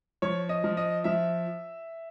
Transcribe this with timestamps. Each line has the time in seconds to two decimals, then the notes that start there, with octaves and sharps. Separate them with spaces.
0.22 F3 C#5
0.49 D#5
0.64 F3
0.77 D#5
1.04 F3 E5